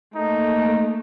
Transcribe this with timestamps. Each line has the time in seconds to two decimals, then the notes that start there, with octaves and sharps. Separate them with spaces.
0.16 A3 A#3 D#4